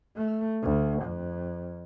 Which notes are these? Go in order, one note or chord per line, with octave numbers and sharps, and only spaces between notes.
A3
D2
F2